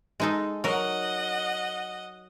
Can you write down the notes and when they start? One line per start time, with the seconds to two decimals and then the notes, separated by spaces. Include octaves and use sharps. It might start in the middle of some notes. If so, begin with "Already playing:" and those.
0.20 G#3 D#4 A4
0.64 F#3 A#4 D#5 F#5